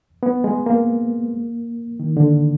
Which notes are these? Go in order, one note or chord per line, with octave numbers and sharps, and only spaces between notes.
B3
G#3
A#3
D#3
D3